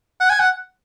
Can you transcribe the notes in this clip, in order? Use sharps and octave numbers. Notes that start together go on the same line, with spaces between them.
F#5
G#5
F#5